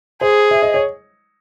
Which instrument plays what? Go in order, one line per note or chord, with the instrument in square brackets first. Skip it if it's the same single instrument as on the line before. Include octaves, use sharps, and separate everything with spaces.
[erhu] G#4 [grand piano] C5
[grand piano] E5
D#5
C#5